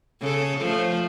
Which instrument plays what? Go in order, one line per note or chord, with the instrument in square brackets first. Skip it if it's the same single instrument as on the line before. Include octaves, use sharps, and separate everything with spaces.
[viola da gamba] C#3 A4
F3 A3